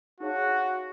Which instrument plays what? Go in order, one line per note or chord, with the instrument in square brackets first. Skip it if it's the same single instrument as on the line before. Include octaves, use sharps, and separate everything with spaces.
[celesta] D#4 G#4 C#5 F5 A5 [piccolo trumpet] F#4